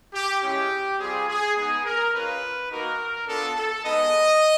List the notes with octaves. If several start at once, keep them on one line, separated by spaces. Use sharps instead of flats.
G4
G#3 C#4 E4 G4
G3 C4 F4 G#4
G#4
G#3 B3 D#4 G#4
A#4
G#3 C#4 F4 B4
A#3 D#4 F#4 A#4
B3 D4 F4 A4
A4
G#3 B3 D#4 D#5